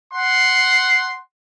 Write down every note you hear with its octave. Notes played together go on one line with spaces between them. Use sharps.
F#5 C6